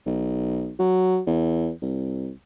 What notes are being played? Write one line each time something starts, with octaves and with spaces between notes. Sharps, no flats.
B1
F#3
E2
C2